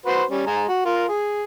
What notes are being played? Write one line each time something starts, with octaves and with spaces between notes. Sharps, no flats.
F#4 B4 C5
G3 C#4
G#3 G#5 A#5
F#4
F4 A#4
G#4